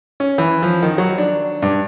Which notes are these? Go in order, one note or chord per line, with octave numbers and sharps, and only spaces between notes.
C#4
E3
F3
D#3
F#3
D4
G2